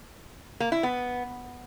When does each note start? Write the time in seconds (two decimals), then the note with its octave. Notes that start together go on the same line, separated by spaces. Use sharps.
0.60 A#3
0.72 E4
0.83 B3